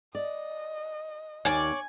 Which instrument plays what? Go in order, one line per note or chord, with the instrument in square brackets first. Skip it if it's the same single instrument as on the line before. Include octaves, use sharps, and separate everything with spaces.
[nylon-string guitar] D5 [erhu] D#5
[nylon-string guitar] D#2 [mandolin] C#5 D5 [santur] G#5